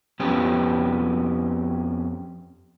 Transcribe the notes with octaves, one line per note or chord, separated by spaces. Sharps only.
F2 B3 C#4 G4